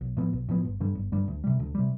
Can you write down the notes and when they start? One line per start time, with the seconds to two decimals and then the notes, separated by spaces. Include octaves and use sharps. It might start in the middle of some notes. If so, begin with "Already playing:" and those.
0.01 B1
0.17 A2 F3 B3
0.33 B1
0.49 A2 F3 B3
0.65 G1
0.80 G2 D3 G3
0.95 G1
1.12 G2 D3 G3
1.28 D2
1.44 C3 G3
1.59 D2
1.75 C3 G3